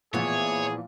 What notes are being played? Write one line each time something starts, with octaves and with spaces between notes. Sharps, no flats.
A#2 E3 F3 B3 G#4 C#5